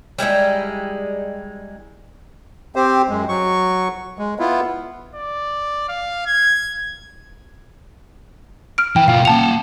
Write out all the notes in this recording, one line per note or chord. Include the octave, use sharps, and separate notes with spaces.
G3 G#3 D#4 E4
C4 G4 C5
F#2 G#3
F#3 C#6
G#3
B3 E4 F4
D5
F5
G#6
F6 D7
E3 G5
B2 F4 F5
A#3 F#5 A5 F7